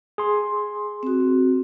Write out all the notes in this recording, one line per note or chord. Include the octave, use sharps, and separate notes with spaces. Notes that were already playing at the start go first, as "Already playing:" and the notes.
G#4 C6
C4 F#4